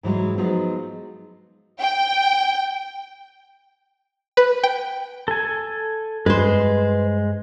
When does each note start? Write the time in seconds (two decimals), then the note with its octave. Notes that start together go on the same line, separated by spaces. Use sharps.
0.03 G#2 E3 F#3 G#3
0.38 F3 F#3 G#3 B3 D#4
1.81 G5
4.37 B4
4.63 G5
5.28 A4 G#5
6.26 G2 G#3 B4 C5